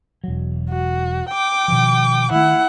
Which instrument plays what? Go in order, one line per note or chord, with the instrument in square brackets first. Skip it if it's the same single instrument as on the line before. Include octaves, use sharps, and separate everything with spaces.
[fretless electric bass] E1 F#3
[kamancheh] F#4
G5 D6
[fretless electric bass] B2 D#3 F3
[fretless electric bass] D#3 A3 [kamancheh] E4 F#5